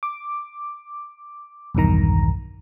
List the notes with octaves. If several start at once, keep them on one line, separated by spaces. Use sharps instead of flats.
D6
B1 E2 G2 D#3 A#5